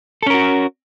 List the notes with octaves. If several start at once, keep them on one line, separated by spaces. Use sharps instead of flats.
C#4 F#4 A4 A#4